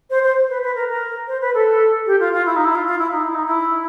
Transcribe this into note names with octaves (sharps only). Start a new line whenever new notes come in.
C5
C5
B4
B4
A#4
A#4
C5
B4
A4
G4
F4
F4
E4
D#4
E4
F4
F4
E4
D#4
E4
D#4
E4